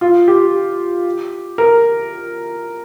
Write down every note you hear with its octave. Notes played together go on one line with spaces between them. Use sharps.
F4
G4
A#4